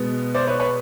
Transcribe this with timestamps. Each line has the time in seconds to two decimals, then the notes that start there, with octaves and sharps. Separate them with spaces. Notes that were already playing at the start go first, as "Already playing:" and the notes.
Already playing: B2 G#3 B3
0.35 C5 D5
0.47 B4 C#5
0.60 B4 C#5